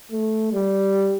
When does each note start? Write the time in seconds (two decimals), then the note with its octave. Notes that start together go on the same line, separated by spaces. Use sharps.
0.12 A3
0.53 G3